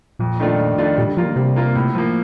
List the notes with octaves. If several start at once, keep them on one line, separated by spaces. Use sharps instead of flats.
F2 A#2
D#3 A3 D4 F4
F2
D#3 A3 D4 F4
A#2 G3
D3
F3 A#3 F4 A#4
D#3
C3 G3
A#3 F4 A#4
A2
F3 A#3